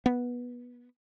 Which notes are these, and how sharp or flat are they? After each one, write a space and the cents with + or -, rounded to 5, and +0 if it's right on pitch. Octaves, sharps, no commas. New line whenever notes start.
B3 -15